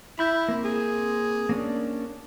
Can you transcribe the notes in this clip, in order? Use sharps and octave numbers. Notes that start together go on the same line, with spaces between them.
E4 B5 G6
A#3 C4
G#4
A#3 C#4 D4